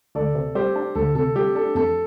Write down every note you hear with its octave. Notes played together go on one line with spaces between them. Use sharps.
D2 A4 D5
C3
G3 G4 C5
D4
D2 A4
C3 A4
G3 G4
D4 A4
F2 A4